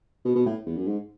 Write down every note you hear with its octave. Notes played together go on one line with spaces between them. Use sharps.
B2
B2
A2
E2
F#2
G#2